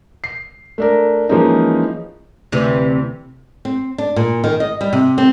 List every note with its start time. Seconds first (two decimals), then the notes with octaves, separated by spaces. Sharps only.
0.24 C7
0.78 A3 D4 A#4
1.29 E3 F3 G#3 A#3 C#4 D#4
2.52 D2 C3 E3
3.65 C4
3.98 D4
4.16 A#2
4.44 D#3
4.60 D#5
4.81 G3
4.93 C3
5.18 C4